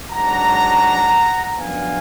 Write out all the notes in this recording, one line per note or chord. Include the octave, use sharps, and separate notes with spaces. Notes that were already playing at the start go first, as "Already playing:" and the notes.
G#2 F#3 D4 F#5 A#5
F#2 F3 B3 D4 F5 G#5